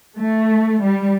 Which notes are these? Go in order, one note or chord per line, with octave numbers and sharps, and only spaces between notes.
A3
G3